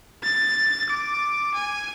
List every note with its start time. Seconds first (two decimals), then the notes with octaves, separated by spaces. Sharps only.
0.24 A6
0.90 D6
1.54 G#5